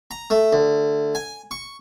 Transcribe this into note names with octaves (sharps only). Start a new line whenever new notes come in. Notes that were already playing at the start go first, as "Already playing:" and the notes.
A#5
A3
D2
G#5
C#6